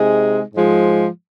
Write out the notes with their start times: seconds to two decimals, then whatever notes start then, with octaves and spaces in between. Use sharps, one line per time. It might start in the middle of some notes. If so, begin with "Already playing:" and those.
Already playing: C3 G#3 D#4 G#4
0.54 G#2 F3 G#3